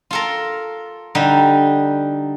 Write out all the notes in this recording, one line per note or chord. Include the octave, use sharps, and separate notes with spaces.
F4 A4 A#4
D3 G3 D#4